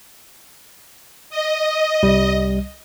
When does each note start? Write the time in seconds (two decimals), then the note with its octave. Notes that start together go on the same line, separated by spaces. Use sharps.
1.30 D#5
2.03 C2 G3